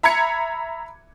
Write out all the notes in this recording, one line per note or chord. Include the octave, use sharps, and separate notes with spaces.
E5 A#5 B5 G#6 C#7